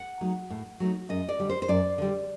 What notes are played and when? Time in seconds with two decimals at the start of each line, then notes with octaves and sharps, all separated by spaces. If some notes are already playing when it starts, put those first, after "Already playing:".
Already playing: F#5
0.21 F#3 A3 D#4
0.50 A2
0.80 F#3 A3 D#4
1.09 F#2 D#5
1.29 D5
1.39 D3 G3
1.49 C5
1.62 C5
1.68 F#2 D5
1.98 D3 G3